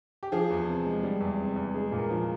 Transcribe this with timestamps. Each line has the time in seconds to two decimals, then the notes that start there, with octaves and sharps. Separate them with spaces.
0.23 G4
0.32 F3 G#4
0.50 E2
0.67 C3
0.86 G#3
1.03 G3
1.21 E2
1.39 C3
1.56 E2
1.74 G#3 G#4
1.92 A#2
1.98 A#4
2.10 F3